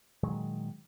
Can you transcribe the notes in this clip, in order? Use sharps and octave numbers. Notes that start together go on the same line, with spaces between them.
A#2 D#3 F#3 G#3